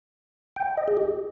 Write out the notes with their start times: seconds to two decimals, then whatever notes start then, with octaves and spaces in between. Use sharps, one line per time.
0.56 G5
0.77 D#5
0.88 G#4
0.97 G4